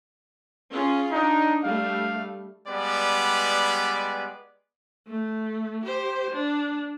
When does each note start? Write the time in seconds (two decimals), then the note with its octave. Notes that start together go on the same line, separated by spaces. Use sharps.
0.70 C#4 F4 G#4
1.11 D4 D#4
1.64 G3 A3 F5
2.68 G3 G#3 B3 B4 D5
5.07 A3
5.85 G4 C5
6.31 D4